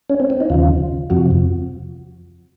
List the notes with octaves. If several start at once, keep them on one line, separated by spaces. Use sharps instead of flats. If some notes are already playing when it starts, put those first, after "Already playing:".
C#4
C4
C4
D#4
D#2 C#3 F3 F4
F2 C3 F3 F#4